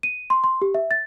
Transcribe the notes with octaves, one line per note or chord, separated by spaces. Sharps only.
D#7
C6
C6
G4
E5
A6